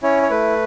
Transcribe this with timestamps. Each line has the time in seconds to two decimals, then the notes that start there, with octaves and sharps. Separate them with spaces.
0.03 C#4 E4 C#5
0.22 C#5
0.30 A3 B4